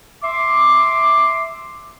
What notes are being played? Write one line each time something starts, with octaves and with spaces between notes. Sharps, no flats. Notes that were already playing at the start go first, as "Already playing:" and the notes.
E5 C6 D6